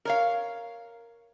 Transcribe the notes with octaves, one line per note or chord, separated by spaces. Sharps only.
A#4 C#5 F5